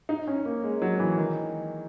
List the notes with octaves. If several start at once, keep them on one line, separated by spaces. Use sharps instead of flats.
D#4
C#4
A#3
G#3
F#3
E3
D#3